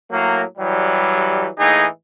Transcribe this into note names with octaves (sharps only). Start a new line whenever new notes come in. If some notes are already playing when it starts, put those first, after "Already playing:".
A2 F#3 A#3
E3 F#3 G3
A2 E3 A#3 D#4 G#4